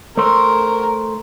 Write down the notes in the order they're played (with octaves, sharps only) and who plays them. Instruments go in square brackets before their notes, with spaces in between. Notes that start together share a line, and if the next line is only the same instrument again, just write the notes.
[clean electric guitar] A3 C5 [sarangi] A#4